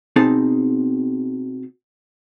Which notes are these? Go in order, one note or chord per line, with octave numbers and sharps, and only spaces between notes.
B2 C4 D#4 G#4 A5